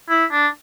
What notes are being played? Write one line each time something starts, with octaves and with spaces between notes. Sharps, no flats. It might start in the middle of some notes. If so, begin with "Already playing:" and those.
E4
D4